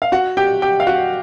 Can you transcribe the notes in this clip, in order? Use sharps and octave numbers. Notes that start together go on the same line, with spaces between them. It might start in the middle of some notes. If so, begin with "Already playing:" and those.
F5
F#4 F#5
G4 G5
G4 G5
F5
F#4 F#5